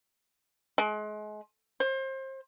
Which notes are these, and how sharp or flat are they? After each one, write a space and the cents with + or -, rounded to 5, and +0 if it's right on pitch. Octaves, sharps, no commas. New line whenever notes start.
G#3 +35
C5 +30